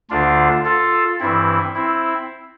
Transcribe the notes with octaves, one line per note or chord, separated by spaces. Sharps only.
D2 D3 D4 F4
F4 A4
G2 E3 C4 E4
C4 E4